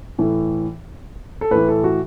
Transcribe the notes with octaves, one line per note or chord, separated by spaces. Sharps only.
A2 E3
A4
A2 E3 B4
A4
F#4